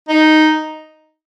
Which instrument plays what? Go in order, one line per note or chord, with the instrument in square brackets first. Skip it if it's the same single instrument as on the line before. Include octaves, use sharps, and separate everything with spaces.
[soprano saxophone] D#4